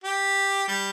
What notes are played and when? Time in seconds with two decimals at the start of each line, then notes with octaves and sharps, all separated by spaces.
0.04 G4
0.68 G3